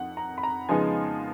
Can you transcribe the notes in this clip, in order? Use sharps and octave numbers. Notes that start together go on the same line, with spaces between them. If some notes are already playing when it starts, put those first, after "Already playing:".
Already playing: F2 D#3 F#5
A#5
B5
A#5
C#3 F3 G#3 B3 D#4 G#5